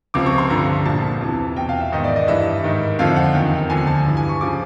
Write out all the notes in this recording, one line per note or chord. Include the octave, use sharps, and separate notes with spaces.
C#2 C3 F3 D6
C#6
C6
G2 D3 F3 A#5
C2 A#2 F3 A5
E2 C3 E3
E2 B2 G5
F5
E5
G#2 D#3 D#5
D5
D#5
G2 E3 E5
G#2 D#3
F2 D3 F3 F5
F#5
E2 C3 D#3 G5
D2 D3 F3 G#5
A5
G2 E3
G#5
C#6
C#3 F3 D6